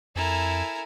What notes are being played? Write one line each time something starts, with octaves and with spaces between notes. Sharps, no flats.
F2 E4 A4 A#4 G#5